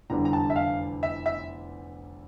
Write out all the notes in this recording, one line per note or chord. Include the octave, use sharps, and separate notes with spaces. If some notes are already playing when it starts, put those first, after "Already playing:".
F1 E2 D3 G3 D4 A#5
A#5
A5
E5
F5
E5
E5